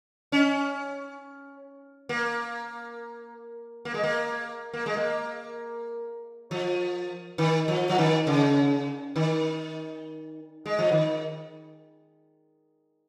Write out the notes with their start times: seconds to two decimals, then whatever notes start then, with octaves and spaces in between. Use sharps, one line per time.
0.32 C#4
2.09 A#3
3.85 A#3
3.94 G#3
4.03 A#3
4.73 A#3
4.86 G#3
4.97 A#3
6.51 F3
7.38 D#3
7.68 F3
7.89 F3
7.98 D#3
8.27 C#3
9.16 D#3
10.66 G#3
10.79 F3
10.92 D#3